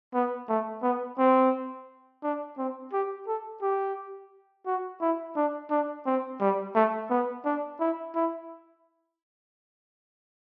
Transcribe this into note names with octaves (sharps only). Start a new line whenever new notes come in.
B3
A3
B3
C4
D4
C4
G4
A4
G4
F#4
E4
D4
D4
C4
G3
A3
B3
D4
E4
E4